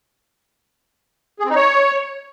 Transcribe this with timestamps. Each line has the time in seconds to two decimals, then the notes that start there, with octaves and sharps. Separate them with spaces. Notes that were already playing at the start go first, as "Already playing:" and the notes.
1.40 G#4
1.45 C4
1.50 D#4
1.56 C#5